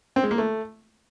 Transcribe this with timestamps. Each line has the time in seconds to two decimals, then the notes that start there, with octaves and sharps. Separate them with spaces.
0.16 C4
0.24 G#3
0.31 A#3
0.38 A3